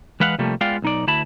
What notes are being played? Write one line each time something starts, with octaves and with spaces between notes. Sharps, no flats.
E3 G#3 B4 F5 F#5
C3 F3 G3 A3 A#3
G#3 B3 F4 D5 F5 G5
B1 D#4 D5
D2 E4 A5 B5